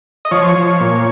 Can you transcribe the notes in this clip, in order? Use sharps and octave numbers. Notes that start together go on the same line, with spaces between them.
D#5
F3 C#5
F3
A#2